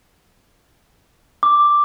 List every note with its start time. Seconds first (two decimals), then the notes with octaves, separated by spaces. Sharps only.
1.43 D6